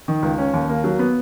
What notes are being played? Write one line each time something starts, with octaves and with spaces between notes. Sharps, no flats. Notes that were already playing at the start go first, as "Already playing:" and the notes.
D#3
C#2
C#4
D#2
A#3
F#3
B3